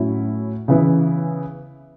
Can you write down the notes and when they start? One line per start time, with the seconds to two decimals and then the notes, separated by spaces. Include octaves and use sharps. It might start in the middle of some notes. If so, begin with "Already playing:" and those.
Already playing: A2 F#3 C#4 E4
0.68 C#3 E3 B3 E4